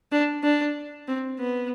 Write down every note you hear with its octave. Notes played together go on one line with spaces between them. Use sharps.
D4
D4
C4
B3